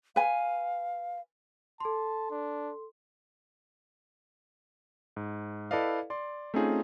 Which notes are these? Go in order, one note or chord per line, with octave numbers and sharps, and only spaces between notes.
B4 F5 G#5
A4 A5 C6
D4
G#2
E4 A4 B4 D5 D#5 F5
D5 C6
A3 C4 C#4 D#4 F4 G#4